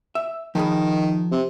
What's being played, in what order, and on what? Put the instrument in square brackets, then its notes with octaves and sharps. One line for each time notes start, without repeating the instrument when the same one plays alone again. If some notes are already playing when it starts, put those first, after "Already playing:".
[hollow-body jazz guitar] E5
[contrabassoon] D#3 [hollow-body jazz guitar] F3 G#4 B5
[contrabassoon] C3